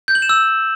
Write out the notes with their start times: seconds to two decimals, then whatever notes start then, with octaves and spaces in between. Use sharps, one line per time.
0.08 G6
0.15 F#7
0.22 E7
0.29 E6